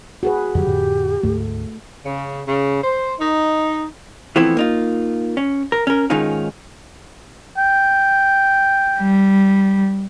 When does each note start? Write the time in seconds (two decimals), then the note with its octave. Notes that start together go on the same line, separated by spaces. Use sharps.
0.23 F#4 G#4 B4
0.55 F2 D3 F#3 G4
0.67 F2 A2 D3
1.23 D2 G#2 A3
2.04 C#3
2.46 C#3
2.82 C5
3.19 D#4
4.36 E3 F3 A3 B3 C4 E4
4.57 A#3 D#4 F4
5.37 C#4
5.72 A#4
5.87 C#4 A#4
6.10 G#2 D#3 C#4 D#4 F4
7.57 G5
8.99 G3